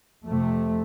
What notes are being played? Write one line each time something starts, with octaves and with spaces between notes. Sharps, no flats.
F2 C3 A3